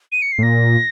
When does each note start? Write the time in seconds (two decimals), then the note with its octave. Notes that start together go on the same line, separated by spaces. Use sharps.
0.12 D#7
0.22 C#7
0.32 C7
0.39 A2
0.43 A#2 A#6